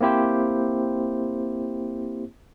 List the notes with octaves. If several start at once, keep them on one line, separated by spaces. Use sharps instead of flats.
A#3 C4 E4 G4 C5